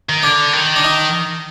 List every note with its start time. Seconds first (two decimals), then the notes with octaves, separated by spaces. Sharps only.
0.09 D#3
0.23 D3 D4
0.53 D#3
0.76 D4
0.84 D#4